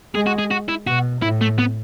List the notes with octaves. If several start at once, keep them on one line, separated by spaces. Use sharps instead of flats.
G#3 G#4
F#4
G#4
F#4
E4
B2 F#4
A2 E4
A3
B3